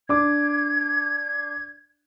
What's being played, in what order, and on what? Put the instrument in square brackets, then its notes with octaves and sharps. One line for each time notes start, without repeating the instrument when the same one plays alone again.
[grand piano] D4 D6 [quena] G#6